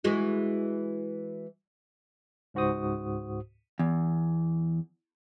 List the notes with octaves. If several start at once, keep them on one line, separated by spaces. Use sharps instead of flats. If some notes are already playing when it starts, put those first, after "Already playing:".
E3 G#3 F#4
C#2 G#2 F#4 C5 D#6
E2